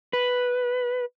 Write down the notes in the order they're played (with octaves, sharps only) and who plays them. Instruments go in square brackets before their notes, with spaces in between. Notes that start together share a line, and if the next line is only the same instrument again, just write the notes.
[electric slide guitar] B4